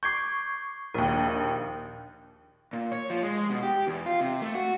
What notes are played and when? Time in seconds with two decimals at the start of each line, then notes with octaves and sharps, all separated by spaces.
0.03 C#6 D6 G6 G#6 C7
0.94 A#1 D#2 A#4
2.73 A#2
2.92 C#5
3.10 F3
3.23 G#3
3.50 B2
3.63 G4
3.87 E2
4.06 F4
4.21 C3
4.42 A3
4.55 F#4